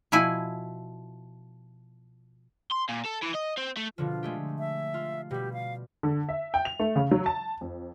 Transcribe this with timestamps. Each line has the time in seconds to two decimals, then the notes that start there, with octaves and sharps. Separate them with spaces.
0.12 B2 F3 E4 G#5
2.71 C6
2.89 A#2
3.05 A4
3.22 E3
3.34 D#5
3.57 C4
3.77 A3
3.98 B2 D3 F3 F4
4.23 G#3 A3 G4
4.59 E5
4.94 F4
5.31 B2 G3 G4
5.53 F5
6.03 D3
6.29 E5
6.54 G5
6.65 F7
6.80 A3
6.96 C#3
7.11 F#3
7.26 A5
7.61 F2